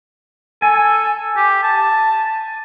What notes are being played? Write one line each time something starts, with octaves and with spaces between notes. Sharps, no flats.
A4 G#5
G4
A5